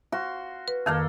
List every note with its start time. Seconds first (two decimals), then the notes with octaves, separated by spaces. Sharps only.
0.12 F#4 F5 C6
0.68 B4
0.86 F2 D#3 A#3 A4 F5